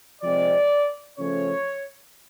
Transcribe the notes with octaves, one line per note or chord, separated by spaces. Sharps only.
C3 F3 G#3 C4 D5
C#3 F3 A3 C#4 C#5